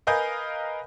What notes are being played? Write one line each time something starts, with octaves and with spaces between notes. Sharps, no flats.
A#4 B4 D#5 F5 G#5 G6